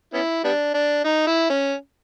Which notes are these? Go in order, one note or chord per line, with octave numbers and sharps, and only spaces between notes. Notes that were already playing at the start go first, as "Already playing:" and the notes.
B3 C#4 E4
G3 B3 D4
D4
D#4
E4
C#4